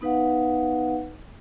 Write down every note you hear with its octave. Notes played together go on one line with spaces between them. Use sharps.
B3 D#4 B4 F5 F#5